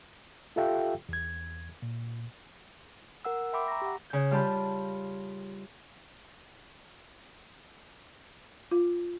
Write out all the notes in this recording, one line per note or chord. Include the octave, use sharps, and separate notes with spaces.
F4 G4 A4 E5 F5 G5
E2 G#6
A#2
A#4 F#5 E6
E5 G5 B5 C6 D6 E6
A#5 C#6 A#6
G4 F#5
C#3 G6
G3 F4 G4 A5 B5 G6
F4